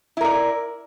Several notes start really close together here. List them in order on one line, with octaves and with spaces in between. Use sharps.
E4 A#4 D5